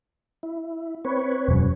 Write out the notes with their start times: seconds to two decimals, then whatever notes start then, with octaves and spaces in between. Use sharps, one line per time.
0.43 E4
1.05 C4 B4 C#5
1.48 E1 F#2